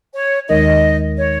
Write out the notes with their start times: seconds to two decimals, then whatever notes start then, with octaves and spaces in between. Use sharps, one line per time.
0.15 C#5
0.49 D#2 D#3 G#3 D#4 A#4 D#5
1.18 C#5